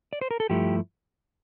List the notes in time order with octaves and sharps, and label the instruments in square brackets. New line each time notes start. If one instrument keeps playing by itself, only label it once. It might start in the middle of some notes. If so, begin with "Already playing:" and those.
[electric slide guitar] D5
C5
A#4
A4
G2 F3 A3 E4 G4